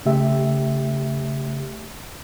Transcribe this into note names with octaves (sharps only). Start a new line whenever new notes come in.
C#3 A3 G4 E5